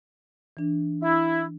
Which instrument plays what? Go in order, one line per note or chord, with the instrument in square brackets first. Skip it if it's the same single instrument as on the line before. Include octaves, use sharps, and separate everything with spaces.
[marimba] E3 D4
[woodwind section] E4